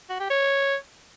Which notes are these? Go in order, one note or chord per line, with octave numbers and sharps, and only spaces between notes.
F#4
G4
C#5